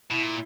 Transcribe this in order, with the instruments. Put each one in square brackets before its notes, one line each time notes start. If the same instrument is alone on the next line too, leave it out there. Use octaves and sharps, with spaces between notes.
[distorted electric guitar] B2 [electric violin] E4
[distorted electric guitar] A#2